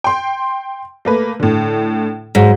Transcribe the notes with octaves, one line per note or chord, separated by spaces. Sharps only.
G5 C6
A3 A#3 B4
A2 D3
G#2 F#3